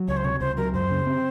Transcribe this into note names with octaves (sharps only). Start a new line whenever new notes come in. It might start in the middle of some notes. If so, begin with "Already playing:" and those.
Already playing: F#3
C#2 C#5
C5
C3 C#5
C#2 C5
F#3 A#4
F#2 C5
C#3
C4